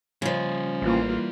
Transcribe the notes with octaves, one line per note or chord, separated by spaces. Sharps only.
C#3 F3 G3 D#5
A1 E3 A#3 F4